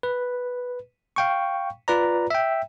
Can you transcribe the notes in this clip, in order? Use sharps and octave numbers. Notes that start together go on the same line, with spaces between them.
B4
F5 G5 C#6
F4 B4 D5 A#5
E5 G5